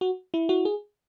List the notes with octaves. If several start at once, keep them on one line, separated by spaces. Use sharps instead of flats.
F#4
E4
F#4
G#4